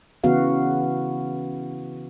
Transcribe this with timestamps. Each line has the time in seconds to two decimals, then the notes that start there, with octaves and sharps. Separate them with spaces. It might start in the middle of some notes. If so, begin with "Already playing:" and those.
0.24 C#3 E3 B3 F#4 F5